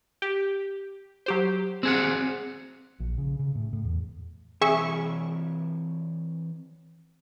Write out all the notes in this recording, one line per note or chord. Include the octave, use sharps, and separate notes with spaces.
G4
F#3 G4 C5
C4 G#4 F#5
A#1
C#3
C#3
A2
A2
E2
E3 C4 G#4 C#5 E5 C#6